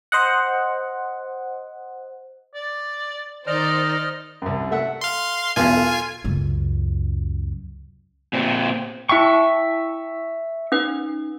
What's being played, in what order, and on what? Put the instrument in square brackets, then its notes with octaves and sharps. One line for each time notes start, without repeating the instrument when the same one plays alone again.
[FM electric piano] C5 D#5 F#5
[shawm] D5
[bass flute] D#3 [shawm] D#4 [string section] C5 D5 [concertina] D#5 F6
[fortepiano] C2 F#2
A3 E5 F#5
[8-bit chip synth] F5 C6
[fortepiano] B1 E2 [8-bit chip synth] F4 G#5
[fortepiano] A4
[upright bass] C#2 F#2
[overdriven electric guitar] A#2 C4
[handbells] E4 G5 [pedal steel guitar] E5 C#6
[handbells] C#4 D#4 B4